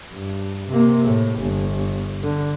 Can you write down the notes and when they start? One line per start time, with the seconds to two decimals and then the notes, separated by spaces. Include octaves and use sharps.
0.13 G2
0.70 C3 A#3
1.05 A2
1.40 G1
2.22 D3